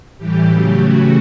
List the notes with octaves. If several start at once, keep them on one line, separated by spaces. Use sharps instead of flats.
A2 E3 G3 G4
C#3 F#3 A3
C#3 E3 A3 F#4